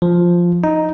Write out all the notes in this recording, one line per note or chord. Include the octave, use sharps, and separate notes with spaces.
F3
D#4